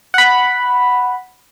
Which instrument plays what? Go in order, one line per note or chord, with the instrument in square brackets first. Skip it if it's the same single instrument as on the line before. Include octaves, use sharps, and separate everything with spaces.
[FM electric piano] F#5 B5